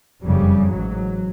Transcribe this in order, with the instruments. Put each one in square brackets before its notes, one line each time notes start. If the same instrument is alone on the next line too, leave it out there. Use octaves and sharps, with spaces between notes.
[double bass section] F#1 F2 C#3 G3
A1 G#2 F#3